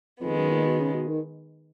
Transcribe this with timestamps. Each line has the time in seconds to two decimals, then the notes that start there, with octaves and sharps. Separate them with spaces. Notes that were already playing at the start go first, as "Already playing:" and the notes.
0.21 F2 D#3 G#3 B3
0.36 F#2
0.51 A#2
0.65 B2
0.80 C#3
0.93 B2
1.08 D#3